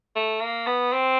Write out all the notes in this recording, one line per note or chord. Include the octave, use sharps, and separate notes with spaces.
A3
A#3
B3
C4